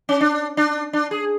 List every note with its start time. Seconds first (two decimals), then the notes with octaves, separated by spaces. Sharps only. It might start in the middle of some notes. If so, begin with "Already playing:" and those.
0.09 C#4
0.21 D4
0.57 D4
0.93 D4
1.11 G#4